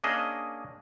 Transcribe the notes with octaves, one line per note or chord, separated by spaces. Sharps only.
A#3 C#4 D4 G#4 D#5 E5